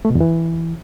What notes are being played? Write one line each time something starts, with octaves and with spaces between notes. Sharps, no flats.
A3
B2
E2
E3